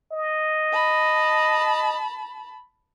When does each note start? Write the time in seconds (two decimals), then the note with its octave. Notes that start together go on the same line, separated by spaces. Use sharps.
0.12 D#5
0.72 A5 B5